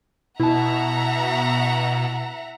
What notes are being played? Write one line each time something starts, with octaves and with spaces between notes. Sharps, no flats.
B2 E4 E5 F#5 A5 A#5